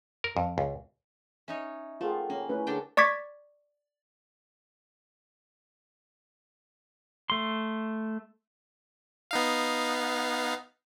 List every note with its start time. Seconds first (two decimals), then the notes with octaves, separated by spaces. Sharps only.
0.24 A#4
0.37 F2
0.58 C#2
1.48 C#4 D#4 C#5 E5
2.01 A3 F4 G#4 A#4 F#5 G5
2.30 A#3 C#4
2.49 A3 C#4 E4 B4
2.67 D3 C#4 D4 G#4 A#4 G5 D6
2.97 D5 C#6 D6 G#6 B6
7.30 A3 C6
9.31 B3 D#4 F5